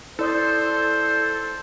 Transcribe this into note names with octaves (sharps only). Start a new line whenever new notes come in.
E4 A4 C5 D5 D#6